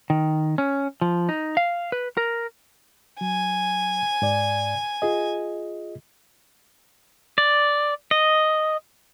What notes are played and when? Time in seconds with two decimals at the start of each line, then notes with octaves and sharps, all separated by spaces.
0.10 D#3
0.58 C#4
1.01 F3
1.29 D#4
1.57 F5
1.92 B4
2.17 A#4
3.21 F#3 G#5
4.22 G#2 D5
5.02 F4 G#4 D#5
7.38 D5
8.11 D#5